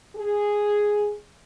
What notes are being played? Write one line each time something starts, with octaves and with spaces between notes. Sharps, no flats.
G#4